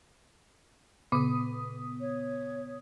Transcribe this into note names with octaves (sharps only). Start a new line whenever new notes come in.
A#2 C#3 B3 D#6
C#5